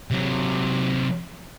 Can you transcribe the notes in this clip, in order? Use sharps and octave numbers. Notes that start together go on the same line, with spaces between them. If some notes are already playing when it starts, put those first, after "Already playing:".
C3 F#3